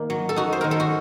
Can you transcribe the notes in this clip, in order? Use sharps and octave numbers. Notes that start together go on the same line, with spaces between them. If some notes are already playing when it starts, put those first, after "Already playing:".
Already playing: D#3 A#3
F#3
A4
D#4 F#4
C5
D#3 A#4
A4
F#4